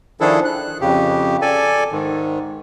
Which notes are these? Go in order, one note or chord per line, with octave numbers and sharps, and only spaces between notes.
D#3 F3 D4 E4 G#4 A4
F#6
F2 C#3 G4
A4 D5 G#5
G#2 D#3